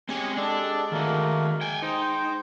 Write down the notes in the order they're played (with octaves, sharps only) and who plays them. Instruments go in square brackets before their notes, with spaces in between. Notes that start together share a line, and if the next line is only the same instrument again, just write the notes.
[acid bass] G#3 [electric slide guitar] C4 C#4 G#5 [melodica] G4
[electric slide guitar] D4 [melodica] G4 A4 D5
[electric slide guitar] D#3 F#4 [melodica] A3 A#3 A#4
[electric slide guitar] G5 G#5
[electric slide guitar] D#4 [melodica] C5 G5